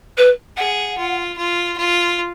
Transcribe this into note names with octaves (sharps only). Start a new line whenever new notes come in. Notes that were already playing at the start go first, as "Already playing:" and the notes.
B4
G#4 F#5
F4
F4
F4